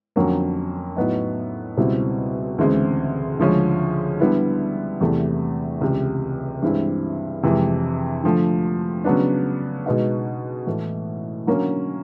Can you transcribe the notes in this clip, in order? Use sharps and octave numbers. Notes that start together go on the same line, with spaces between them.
F2 D3 F#3 A#3 C#4
A2 F#3 B3 D#4
C#2 B2 G3 C4 E4
D2 C#3 E3 G#3 C4
D2 C#3 F3 G#3 C#4
D3 G3 B3 E4
E2 C3 E3 A3
C#2 C3 E3
G2 E3 G#3 C4 E4
F2 C3 E3 G#3
D3 F3 A3
C#3 F#3 B3 D4
B2 G#3 B3 D#4 F#4
A2 E3 A3
D3 F#3 A#3 C#4